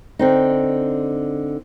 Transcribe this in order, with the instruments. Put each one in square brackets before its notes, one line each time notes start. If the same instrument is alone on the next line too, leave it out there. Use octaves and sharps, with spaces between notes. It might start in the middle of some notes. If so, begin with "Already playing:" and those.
[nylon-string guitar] D3 C4 D#4